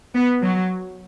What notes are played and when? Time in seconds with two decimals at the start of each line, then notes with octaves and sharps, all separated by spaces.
0.15 B3
0.43 F#3